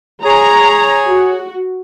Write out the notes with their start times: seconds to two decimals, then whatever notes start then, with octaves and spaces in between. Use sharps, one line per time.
0.24 G#4 C#5 A#5
1.06 F#4